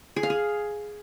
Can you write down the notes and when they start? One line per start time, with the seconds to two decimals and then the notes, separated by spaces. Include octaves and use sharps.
0.16 G#4
0.23 F5
0.30 G#4